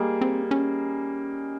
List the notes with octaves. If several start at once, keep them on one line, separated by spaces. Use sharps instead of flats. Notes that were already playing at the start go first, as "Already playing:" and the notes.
Already playing: G3 A#3 D#4 G#4
C4
C#4